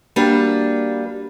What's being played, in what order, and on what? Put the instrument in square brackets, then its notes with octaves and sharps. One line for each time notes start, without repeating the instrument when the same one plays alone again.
[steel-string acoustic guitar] G3 A#3 D4 F#4 B4